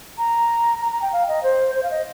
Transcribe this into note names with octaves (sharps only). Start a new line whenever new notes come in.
A#5
A#5
A#5
G5
F5
D#5
C5
C5
F5
D#5